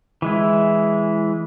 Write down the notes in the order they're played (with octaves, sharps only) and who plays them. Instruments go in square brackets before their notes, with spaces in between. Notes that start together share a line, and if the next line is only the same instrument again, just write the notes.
[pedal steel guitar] E3 G#3 E4